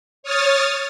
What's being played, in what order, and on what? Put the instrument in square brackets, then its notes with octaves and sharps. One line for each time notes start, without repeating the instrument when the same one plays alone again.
[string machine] C#5 D#6 F6 A6